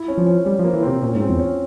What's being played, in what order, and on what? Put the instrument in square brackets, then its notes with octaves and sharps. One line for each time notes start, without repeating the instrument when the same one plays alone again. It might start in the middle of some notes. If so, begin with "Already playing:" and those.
Already playing: [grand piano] E4
C#4
[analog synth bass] F3
[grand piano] C#4
[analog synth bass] G3 [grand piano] C#4
[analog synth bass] F3
[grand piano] A#3
[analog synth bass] E3
[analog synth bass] C3 [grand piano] C4
[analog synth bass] A#2 [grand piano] C#4
[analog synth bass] G#2
[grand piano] C4
[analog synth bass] E2
[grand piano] C#4